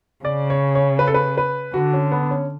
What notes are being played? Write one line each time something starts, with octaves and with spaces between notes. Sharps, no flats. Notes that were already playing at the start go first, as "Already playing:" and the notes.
C#3 D5
C#5
C#5
B4
A4
B4
B4
D3 F#4
C#4
B3
C#4